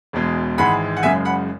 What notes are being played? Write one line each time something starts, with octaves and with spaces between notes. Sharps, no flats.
E1 E2 B2 G#3
G#1 G#2 E3 G#3 F#5 B5
F#5
F#1 F#2 C#3 G#3 E5 G#5
F#5 B5